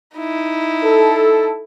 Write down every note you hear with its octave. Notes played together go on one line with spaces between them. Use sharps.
D#4 E4
A4